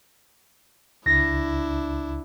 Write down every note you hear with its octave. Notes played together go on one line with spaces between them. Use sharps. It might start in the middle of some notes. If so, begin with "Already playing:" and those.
C#2 D4 E4 A#6